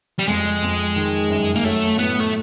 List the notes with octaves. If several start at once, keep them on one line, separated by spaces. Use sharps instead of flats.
G3
F2 G#3
F2
D#3
F#2
A#3
F#3 A3
A2 B3
A3